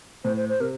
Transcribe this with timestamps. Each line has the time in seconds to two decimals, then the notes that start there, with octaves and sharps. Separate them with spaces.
0.24 A2 C5
0.37 C5
0.49 C5
0.60 C3 A#4